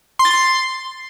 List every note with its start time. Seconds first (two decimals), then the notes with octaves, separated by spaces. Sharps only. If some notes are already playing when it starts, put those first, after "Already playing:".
0.19 C6
0.25 A6
0.31 C6